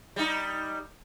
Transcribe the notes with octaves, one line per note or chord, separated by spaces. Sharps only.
G3 D#4